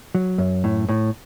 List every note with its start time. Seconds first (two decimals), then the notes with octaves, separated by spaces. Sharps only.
0.15 F#3
0.38 F#2
0.64 A2
0.89 A2